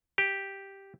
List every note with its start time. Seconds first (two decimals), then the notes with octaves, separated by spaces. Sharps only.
0.18 G4